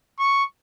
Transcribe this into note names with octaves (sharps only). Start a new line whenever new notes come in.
C#6